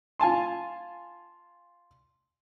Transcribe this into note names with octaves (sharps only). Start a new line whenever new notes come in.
F4 G#5 A5 C6